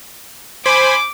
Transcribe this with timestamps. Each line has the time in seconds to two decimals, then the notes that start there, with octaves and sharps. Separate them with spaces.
0.66 C5 G#5 B5 D6